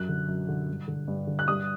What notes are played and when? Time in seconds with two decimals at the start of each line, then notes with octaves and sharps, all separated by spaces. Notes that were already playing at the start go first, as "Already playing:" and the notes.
Already playing: F#2 F#6
0.09 D3
0.28 F#2
0.48 D3
0.69 G2
0.88 D3
1.08 G2
1.27 D3
1.39 F#6
1.48 G2 D#6